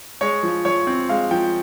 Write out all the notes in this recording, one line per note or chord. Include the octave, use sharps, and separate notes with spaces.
G#3 C#5
F3
F3 C#5
C4
G#3 F5
F3 G5